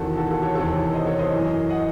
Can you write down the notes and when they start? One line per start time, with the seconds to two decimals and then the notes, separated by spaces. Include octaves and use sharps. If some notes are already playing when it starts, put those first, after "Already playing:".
Already playing: E2 C3 D#3 F#4 A4
0.17 F#4 A4
0.31 F#4 A4
0.42 A4 C#5
0.55 E2 C3 D#3 A4 C#5
0.93 C5 D#5
1.07 A4 C#5
1.19 C5 D#5
1.32 F#2 E3
1.69 D#5 F#5